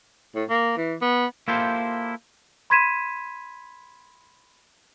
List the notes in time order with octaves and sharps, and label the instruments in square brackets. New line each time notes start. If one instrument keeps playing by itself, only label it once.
[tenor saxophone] A2
A#3
E3
B3
[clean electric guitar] A#3 E4 F4 G4 A4 C5
[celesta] B5 C6 G#6 B6 D#7 E7